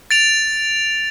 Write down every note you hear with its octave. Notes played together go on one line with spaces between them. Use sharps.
A6 D7 F7